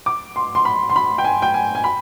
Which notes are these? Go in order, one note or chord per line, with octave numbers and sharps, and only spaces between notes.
D6
C6
C6
B5
C6
B5
G5
G#5
G5
G#5
G#5
B5